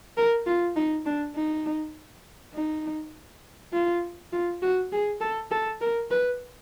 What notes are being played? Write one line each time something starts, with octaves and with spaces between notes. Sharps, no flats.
A#4
F4
D#4
D4
D#4
D#4
F4
F4
F#4
G#4
A4
A4
A#4
B4